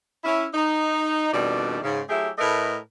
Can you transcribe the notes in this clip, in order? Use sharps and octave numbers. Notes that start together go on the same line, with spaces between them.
C#4 E4
D#4
F2 B2 D#3 G3 D4
G#2 C#3
F#3 A3 E4 G4 G#4
A2 A3 A#4 B4 D#5